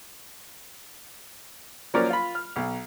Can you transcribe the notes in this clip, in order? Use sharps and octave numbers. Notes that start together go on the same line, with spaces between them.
F3 F#3 A#3 C#4 A#4 D5
F4 B5
F6
B1